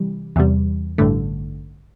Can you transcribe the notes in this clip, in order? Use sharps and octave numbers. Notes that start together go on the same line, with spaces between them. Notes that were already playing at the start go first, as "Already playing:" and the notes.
Already playing: C3 E3 G3
E2 C3 G3
A1 G2 D3 A3